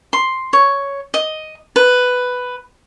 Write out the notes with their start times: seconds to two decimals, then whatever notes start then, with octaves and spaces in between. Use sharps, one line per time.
0.13 C6
0.53 C#5
1.14 D#5
1.76 B4